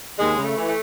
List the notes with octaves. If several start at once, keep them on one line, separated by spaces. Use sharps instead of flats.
D#2 G#3
C#3
A3
E3
A3